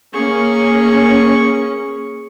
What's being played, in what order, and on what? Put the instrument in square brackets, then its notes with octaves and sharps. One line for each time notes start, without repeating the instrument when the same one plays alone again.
[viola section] A#3 C#4 [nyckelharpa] G#4 C#6